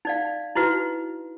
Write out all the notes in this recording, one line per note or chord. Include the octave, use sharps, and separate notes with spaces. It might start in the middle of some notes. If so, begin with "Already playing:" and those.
D#4 D5 F5
D#4 E4 F#4 B4